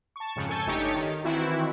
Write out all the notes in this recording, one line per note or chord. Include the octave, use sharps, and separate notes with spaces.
A5 C#6
F2 G#2 C#3
A4 G#5 C#6 E6 G6 A6
G1 A3 D#4 G4 C#5 A6
D#3
D#3 E3 C4 E4 F#4